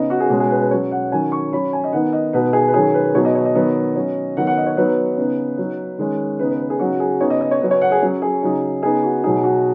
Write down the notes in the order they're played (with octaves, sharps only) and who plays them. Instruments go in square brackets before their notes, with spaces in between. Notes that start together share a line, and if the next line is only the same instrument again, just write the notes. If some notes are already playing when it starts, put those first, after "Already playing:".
Already playing: [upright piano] C#3 B3 D#4 D#5
F#4
G#4
B2 G#3 C#4 F#4
G#4
B4
B4
F#3 C#4 C#5
F#5
D#3 F#3 C#4 G#5
C#6
F#3 C#4 B5
G#5
D#5
D#3 B3 D#4 F#5
D#5
B2 B3 D#4 B4
G#4
B4
D#3 F#3 C#4 G#4
B4
B2 F#3 B3 D#4 C#5
D#5
C#5
D#5
D#3 F#3 B3
F#3 C#4
D#3 F#3 B3 F#5
F#5
D#5
C#5
F#3 B3 D#4 B4
C#3 B3 D#4
F#3 D#4
D#3 G#3 C#4
C#3 B3 D#4 B4
B4
B4
G#4
C#3 F#3 D#4 F#4
G#4
C#3 B3 D#4 C#5
D#5
D#5
C#5
C#3 F#3 C#4 B4
C#5
F#5
G#4
F#3 C#4
G#4
C#3 F#3 D#4
C#3 B3 D#4 G#4
F#4
B2 F#3 D#4 G#4
F#4